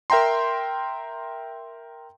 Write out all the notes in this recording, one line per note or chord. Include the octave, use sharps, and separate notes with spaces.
A#4 E5 G5 A#5 C6